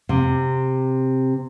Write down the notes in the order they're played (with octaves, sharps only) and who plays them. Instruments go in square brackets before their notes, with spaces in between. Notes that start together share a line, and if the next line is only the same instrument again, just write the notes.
[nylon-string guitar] C3